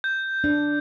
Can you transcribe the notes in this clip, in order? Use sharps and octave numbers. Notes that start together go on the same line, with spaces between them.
G6
D4